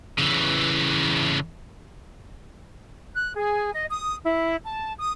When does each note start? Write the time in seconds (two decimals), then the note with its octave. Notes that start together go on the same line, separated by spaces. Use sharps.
0.18 C#3 E3
3.15 F#6
3.35 G#4
3.73 D#5
3.90 D#6
4.24 E4
4.64 A5
4.98 D#6